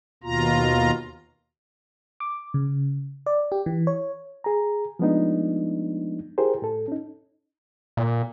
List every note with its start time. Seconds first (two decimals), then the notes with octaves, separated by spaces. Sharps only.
0.24 D#2 B2 F4 A#5
2.20 D6
2.54 C#3
3.26 D5
3.52 G4
3.66 E3
3.87 C#5
4.44 G#4 A#5
4.99 F3 G#3 A3 B3 D4 D#4
6.38 E4 G4 G#4 A#4 C5
6.62 A2 A4
6.88 C#4 D#4
7.97 A#2